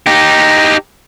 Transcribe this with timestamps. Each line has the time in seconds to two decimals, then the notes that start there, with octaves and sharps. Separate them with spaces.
0.07 D#4 G4